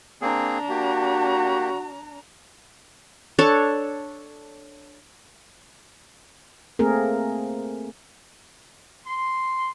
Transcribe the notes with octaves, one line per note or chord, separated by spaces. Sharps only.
A#3 C4 D4 G#4 A#5
A#3 F#4 G4
D4 A4 C#5 A5
A3 A#3 C4 G#4 A#4
C6